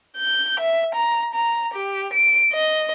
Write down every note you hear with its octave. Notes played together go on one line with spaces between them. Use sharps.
G6
E5
A#5
A#5
G4
D7
D#5